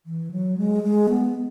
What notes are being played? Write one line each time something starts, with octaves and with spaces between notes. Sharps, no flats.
E3
F#3
G#3
G#3
B3